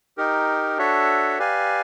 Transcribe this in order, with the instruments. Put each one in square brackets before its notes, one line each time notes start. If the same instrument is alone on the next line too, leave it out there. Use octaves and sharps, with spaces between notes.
[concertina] D#4 G4 A#4
D4 F#4 A4 C#5 E5
G4 B4 D5 F5 G#5